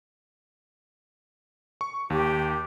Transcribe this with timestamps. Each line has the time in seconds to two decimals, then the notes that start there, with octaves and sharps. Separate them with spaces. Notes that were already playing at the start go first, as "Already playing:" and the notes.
1.81 C#6
2.10 D#2 G4